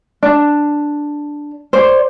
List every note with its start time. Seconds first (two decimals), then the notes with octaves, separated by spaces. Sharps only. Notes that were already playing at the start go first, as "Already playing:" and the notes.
0.23 D4
1.73 C5 D5